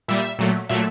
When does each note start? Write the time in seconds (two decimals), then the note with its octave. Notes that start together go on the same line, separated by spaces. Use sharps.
0.08 A#2 G3 E5
0.39 A#2 F#3 A3
0.69 A#2 F#3 A3 E5